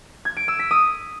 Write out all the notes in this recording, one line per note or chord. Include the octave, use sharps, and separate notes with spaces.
G#6
D7
E6
B6
D#6